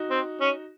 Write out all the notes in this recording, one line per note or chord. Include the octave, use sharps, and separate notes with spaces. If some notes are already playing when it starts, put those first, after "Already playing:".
Already playing: D#4 F#4
C4
C#4